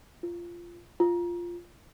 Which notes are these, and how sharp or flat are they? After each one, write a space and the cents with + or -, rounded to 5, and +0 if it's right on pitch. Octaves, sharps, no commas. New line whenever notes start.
F4 -15
F4 -5